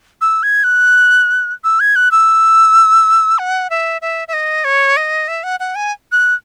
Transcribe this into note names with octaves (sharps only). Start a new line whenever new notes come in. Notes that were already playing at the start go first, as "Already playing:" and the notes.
E6
G#6
F#6
E6
G#6
F#6
E6
F#5
E5
E5
E5
D#5
C#5
D#5
E5
F#5
F#5
G#5
F#6